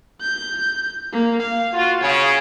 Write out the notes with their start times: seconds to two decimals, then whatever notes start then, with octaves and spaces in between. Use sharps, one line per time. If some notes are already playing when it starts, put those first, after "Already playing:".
0.21 G6
1.13 A#3
1.42 F5
1.73 F4 F#4
2.01 C#3 C#5